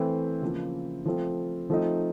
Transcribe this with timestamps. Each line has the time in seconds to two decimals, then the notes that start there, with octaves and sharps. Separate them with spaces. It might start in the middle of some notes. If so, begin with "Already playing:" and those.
Already playing: E3 A3 C4 E4
0.42 C#3 F3 A#3
1.06 F3 A3 C4
1.70 F3 A3 C4 D#4